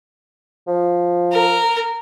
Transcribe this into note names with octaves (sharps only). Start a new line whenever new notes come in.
F3
A#4